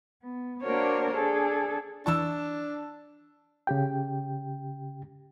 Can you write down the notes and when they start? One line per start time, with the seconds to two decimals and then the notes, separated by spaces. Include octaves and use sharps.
0.22 B3
0.63 A#3 D4 F#4 A#4 C5 C#5
1.17 D4 G#4 A4
2.06 E3 D4 E4 A5 C#6 E6
3.67 C#3 G4 G5